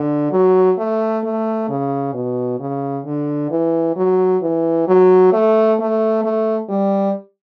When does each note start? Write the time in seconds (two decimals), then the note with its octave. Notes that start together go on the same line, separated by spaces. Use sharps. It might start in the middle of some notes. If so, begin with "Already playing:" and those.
Already playing: D3
0.32 F#3
0.78 A3
1.24 A3
1.69 C#3
2.14 B2
2.59 C#3
3.05 D3
3.51 E3
3.96 F#3
4.42 E3
4.88 F#3
5.33 A3
5.79 A3
6.24 A3
6.69 G3